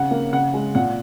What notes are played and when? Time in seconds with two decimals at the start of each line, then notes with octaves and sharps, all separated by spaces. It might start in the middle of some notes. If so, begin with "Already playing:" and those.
Already playing: C#3 F#5
0.11 A#3
0.33 C#3 F#5
0.54 G#3
0.75 A#2 F#5